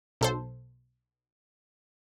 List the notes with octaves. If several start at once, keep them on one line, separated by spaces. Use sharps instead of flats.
B1 A4 C5